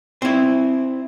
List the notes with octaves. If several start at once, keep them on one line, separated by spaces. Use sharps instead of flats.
C4 E4